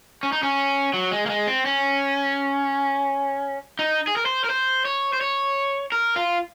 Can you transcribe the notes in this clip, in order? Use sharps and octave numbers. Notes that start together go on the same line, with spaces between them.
C#4
D#4
C#4
F#3
G#3
A#3
G#3
C4
C#4
D#4
G#4
A#4
C5
A#4
C5
C#5
C5
C#5
A#4
F4